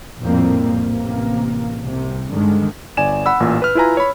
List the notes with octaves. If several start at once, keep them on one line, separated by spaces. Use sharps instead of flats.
A#1 F2 A2 G3 A#3 C4
A1 C3 A#3
C2 C3
G2 D3 D#3 G#3
G1 D5 G#5 E7
F#5 B5 E6
A1 A#2
B4 F6
E4 F4 B4 G#5 A#5
C#5 B5